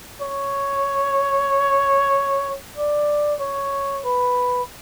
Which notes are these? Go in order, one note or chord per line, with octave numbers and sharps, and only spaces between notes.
C#5
D5
C#5
B4